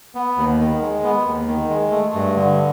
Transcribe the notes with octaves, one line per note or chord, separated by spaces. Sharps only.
B3
D#2
D#3
G#3
B3
D#2
D#3
G#3
A3
G2
D3